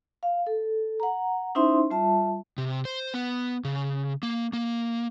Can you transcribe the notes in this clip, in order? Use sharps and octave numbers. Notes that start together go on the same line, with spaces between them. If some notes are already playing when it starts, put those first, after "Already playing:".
F5
A4
F#5 A#5
C#4 D#4 E4 C5 E5 C6
G3 F4 E5 A5
C3
C5
B3
C#3
A#3
A#3